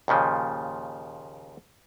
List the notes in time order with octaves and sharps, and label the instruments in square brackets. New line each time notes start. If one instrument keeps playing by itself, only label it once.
[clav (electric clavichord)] D#2 A#2 C#3 F3